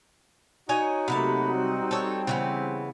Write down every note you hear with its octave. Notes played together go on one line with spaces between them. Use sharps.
D#4 F#4 C#5 D#5 G#5
C3 F#3 A3 A#3 A5 B5
G3 C4
A4 C#5
C#3 E3 B3